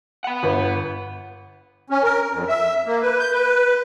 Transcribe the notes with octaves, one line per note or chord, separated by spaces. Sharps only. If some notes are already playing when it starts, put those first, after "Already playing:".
F#5 B5
G1 B4
C#4
A#4
F2
E5
A#3
B4
G6
B4